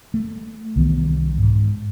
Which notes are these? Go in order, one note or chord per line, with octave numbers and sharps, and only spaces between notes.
A3
C2 D#3 E3 B3
G#2